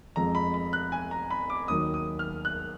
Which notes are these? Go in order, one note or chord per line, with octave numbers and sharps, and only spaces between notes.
F2 F3 G#3 A#5
B5
B5
F#6
G#5
A#5
B5
D6
D#2 D#3 F#3 D#6
D#6
F6
F#6